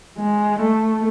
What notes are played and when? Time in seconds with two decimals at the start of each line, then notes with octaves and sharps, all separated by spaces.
0.18 G#3
0.60 A3